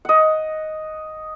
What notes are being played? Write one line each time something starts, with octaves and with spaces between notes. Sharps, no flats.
D#5 F#5